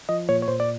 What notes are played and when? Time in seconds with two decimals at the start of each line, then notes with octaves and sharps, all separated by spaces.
0.09 F3 D#5
0.29 A#2 C#5
0.42 C#5
0.48 A#2 C5
0.60 D5